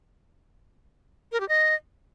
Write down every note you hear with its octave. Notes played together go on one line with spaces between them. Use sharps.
A#4
G4
D#5